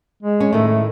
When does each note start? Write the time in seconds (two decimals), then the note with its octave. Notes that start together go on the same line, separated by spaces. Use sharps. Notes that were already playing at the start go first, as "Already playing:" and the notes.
0.23 G#3
0.40 C#4
0.53 A2 D#3 A3 D#4
0.67 A3